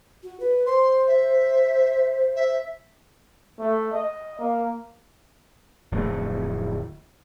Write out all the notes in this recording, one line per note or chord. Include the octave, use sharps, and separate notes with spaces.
F#4
B4
C5 C6
E5
E5
A3
D#5
A#3
D1 F2 A3